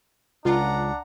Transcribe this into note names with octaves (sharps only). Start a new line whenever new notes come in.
C#2 D4 F4 F#5 A#5